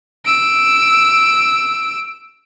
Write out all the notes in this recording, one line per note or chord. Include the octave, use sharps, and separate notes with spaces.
E6 D7